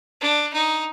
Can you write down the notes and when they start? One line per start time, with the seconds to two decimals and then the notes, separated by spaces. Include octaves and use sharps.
0.21 D4
0.53 D#4